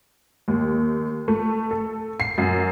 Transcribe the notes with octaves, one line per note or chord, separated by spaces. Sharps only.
D#2
A3
A4
C7
F#2